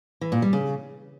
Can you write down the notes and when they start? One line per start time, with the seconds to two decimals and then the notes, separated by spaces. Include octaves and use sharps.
0.21 E3
0.32 A#2
0.42 G3
0.53 C#3